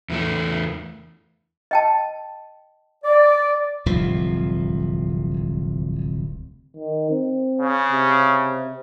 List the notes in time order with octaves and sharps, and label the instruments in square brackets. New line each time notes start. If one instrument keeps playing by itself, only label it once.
[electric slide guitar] E2 E3 A3
[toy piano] D#5 G5 A5
[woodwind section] D5
[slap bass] D1 C2 C3 F3
[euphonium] D#3
C4
[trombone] C#3
[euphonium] C3